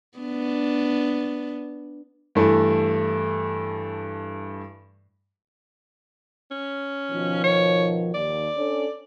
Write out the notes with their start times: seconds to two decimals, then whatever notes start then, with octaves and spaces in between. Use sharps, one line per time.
0.18 B3 D4
2.35 G2 E3 A3
6.51 C#4
7.10 B2 D#3 F3
7.44 C#5
8.15 D#2 D5
8.57 C#4 D4 A4